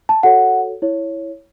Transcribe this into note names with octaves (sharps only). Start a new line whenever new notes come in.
A5
F#4 A4 C#5 F#5
E4 C#5